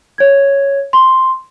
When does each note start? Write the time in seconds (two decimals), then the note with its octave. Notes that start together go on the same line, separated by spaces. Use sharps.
0.18 C#5 G#6
0.93 C6